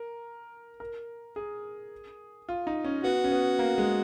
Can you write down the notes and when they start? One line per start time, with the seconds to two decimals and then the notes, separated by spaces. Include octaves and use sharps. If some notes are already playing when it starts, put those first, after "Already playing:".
Already playing: A#4
0.80 A#4
1.36 G#4
2.49 F4
2.67 D#4
2.85 C#4
3.04 B3 F#4
3.24 C#4
3.32 B3
3.59 A#3
3.78 G#3